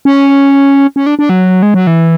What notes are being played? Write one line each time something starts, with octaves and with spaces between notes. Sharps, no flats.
C#4
C#4
D4
D4
F#3
G#3
F#3
E3